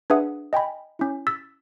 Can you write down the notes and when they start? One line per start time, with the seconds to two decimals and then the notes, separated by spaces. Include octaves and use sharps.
0.10 D4 G#4 B4 E5 F#5 D#6
0.53 D#5 G5 G#5 B5
0.99 C#4 E4
1.27 E6 A6 B6